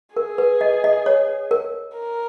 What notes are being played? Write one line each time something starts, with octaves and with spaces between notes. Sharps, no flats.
G#4 A#4
B4
D#5
D#5
C#5
A#4
A#4